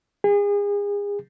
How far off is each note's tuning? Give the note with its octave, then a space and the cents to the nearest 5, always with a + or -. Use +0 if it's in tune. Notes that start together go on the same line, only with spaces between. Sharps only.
G#4 -35